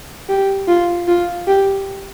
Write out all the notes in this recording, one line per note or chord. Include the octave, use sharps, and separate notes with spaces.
G4
F4
F4
G4